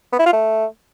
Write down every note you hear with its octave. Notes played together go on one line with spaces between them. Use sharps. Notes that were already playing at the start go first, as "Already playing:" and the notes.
B3
E4
F4
A3